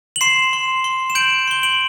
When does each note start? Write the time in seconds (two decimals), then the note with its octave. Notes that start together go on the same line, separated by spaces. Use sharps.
0.16 F#7
0.21 C6 C7 E7
0.53 C6
0.84 C6
1.10 E7
1.15 G6 D7 F#7
1.48 C6 G7
1.63 D7 F#7